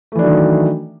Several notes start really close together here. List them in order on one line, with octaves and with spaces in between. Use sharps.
A3 E3 D4 F#3 D#3